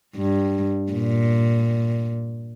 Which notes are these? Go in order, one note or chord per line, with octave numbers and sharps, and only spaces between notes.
G2
A#2